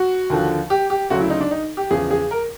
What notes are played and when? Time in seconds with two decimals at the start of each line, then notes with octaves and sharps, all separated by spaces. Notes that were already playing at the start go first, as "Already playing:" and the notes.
Already playing: F#4
0.30 D#2 D3 F3
0.70 G4
0.90 G4
1.10 D2 C#3 F#3 F#4
1.21 E4
1.30 D#4
1.40 D4
1.51 D#4
1.77 G4
1.90 E2 C#3 F3 G#4
2.11 G#4
2.31 A#4